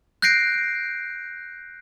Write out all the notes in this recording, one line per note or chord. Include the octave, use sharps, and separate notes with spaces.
F#6 G6 A#6 C7 D7